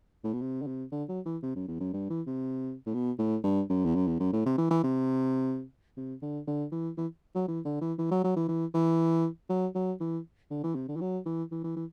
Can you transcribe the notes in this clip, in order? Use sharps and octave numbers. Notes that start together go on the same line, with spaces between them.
A2
B2
C3
D3
C3
D3
F#3
E3
C3
F#2
E2
F#2
G2
E3
C3
A2
B2
A2
G2
F#2
E2
F#2
E2
F#2
A2
C3
E3
E3
C3
C3
D3
D3
E3
E3
F#3
E3
D3
E3
E3
F#3
F#3
E3
E3
E3
F#3
F#3
E3
D3
E3
C3
D3
E3
F#3
E3
E3
E3
E3